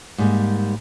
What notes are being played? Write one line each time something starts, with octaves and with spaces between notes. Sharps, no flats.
G#2 G3 A#3